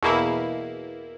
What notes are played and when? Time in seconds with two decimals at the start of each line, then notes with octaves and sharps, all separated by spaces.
0.02 E2 B2 A#3 E4